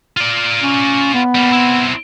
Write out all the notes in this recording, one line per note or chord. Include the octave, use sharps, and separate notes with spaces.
F4 D5
C#4
B3
G3 A#3
C4 E4